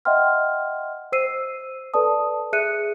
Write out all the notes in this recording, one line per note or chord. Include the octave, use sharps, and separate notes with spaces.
D#5 E5 F#5 G5 C6 F6
C5 E6 C7 D#7
A4 B4 D5 A5 D#6
G#4 E5 F#6 C#7 D#7